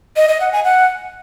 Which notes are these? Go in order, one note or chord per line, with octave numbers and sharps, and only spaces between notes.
D#5
D#5
F#5
G#5
F#5